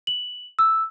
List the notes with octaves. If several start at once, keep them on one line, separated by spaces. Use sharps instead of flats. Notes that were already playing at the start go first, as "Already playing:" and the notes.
F#7
E6